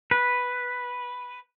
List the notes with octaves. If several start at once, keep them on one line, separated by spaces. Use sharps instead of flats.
B4